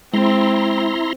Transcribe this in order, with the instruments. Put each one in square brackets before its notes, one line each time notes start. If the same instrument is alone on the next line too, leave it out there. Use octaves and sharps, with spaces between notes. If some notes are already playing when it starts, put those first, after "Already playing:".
[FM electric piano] G#3 [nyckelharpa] C4 [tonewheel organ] E4 A#5 C6